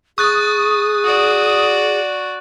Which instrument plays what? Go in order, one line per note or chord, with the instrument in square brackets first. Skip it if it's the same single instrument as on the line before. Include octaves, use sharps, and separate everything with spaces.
[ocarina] G#4 [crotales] C#6 F#6 A6 [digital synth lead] D#6
[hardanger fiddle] F#4 D5